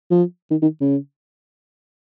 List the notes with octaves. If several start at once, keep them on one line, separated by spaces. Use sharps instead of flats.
F3
D#3
D#3
C#3